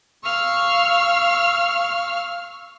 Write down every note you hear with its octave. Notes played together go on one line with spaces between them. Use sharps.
F5 C#6 E6 F6